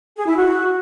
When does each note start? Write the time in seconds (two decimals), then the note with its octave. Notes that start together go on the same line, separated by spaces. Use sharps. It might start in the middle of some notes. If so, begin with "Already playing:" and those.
0.17 G#4
0.27 E4
0.36 F#4